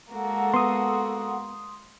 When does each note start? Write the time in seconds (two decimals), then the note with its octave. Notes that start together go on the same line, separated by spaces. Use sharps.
0.10 G#3 A#3 F#4 A4 F#5
0.54 B3 C6 D#6